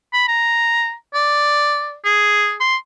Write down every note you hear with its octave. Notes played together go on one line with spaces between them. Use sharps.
B5
A#5
D5
G#4
C6